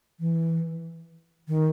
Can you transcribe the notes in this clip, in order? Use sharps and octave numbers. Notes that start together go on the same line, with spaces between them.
E3
D#3